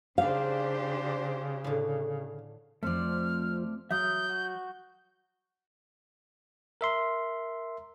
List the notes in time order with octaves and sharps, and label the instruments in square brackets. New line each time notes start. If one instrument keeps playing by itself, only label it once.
[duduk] C#3 [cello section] D4 G4 C5 [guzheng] D#4 G#4 [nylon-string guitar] F5
[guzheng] A2 D3
[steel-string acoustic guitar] F2 F3 [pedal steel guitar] A3 C4 D5 [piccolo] F6
[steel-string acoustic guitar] F#3 [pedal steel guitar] E5 D#6 F6 [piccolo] G6
[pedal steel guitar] F#4
[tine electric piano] A#4 E5 C6